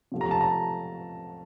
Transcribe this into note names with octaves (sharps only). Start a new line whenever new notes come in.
C3 F3 A3
A#5
A5
A#5